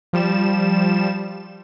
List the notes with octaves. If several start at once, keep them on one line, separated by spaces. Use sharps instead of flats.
F3 G3 E7